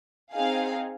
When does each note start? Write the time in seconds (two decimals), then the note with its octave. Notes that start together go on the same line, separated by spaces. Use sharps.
0.34 C4 D#4 G#4 F5